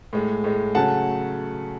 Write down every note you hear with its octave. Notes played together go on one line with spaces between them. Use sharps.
A2 G#3
A2 G#3
C#3 F#3 A3 F#5 A5